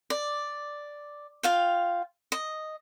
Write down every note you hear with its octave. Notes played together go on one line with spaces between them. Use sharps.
D5
F4 F5 G5
D#5